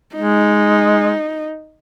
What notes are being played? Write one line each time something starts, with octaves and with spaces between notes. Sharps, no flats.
G#3 D#4